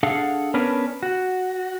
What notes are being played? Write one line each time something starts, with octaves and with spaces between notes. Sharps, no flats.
D4 G#4 A4 F5 F#5
B3 C#4 D4 A#4 B4
F#4